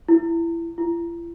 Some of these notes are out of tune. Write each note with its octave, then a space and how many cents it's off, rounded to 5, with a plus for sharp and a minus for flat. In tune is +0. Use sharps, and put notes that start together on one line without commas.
E4 +25
E4 +45